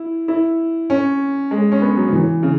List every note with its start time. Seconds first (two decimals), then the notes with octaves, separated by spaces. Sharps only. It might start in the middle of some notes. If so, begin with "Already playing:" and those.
Already playing: E4
0.28 E4
0.90 C#4
1.51 G#3
1.72 C#4
1.82 B3
1.97 F#3
2.07 C#3
2.13 E3
2.43 C#3